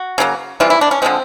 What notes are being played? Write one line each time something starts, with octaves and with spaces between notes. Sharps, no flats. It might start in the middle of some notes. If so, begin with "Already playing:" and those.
Already playing: F#4
C#3 F#3 A#3
C3 E3 G3 F4
E4
D4
C#4
D3 F3 G#3 C4